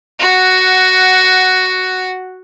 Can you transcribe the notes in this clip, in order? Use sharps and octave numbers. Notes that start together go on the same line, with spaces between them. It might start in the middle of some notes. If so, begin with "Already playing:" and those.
F#4 F#5